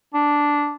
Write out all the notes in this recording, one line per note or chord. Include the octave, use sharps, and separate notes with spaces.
D4